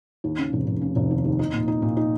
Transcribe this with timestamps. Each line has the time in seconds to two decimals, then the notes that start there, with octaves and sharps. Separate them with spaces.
0.24 D#2
0.38 C#3
0.53 F1
0.67 F1
0.81 C#3
0.96 F1
1.11 D#2
1.25 D#2
1.39 D#4
1.53 A#2
1.68 D#4
1.82 A#2
1.97 D#4